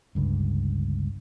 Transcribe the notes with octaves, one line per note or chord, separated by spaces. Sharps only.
G1 C#2 G2